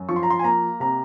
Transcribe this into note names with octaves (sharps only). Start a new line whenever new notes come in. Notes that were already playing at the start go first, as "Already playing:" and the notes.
Already playing: F#2
F3 C#6
C6
A#5
C6
G#5
A#3 A#5
C3 A#5